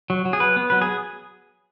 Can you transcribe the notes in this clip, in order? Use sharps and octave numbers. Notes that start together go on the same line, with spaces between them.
F#3
F#3
G#4
F#3 B4
B3
F#3 B4
G#4